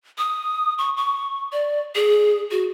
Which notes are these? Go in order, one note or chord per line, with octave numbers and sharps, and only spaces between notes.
D#6
C#6
C#6
D5
G#4
F#4